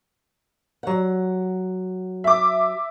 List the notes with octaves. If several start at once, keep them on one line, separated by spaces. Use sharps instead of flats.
F#3 F#5
E5 D6